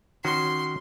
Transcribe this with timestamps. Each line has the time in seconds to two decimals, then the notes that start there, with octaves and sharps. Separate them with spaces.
0.25 D#3 C#4 F#4 C6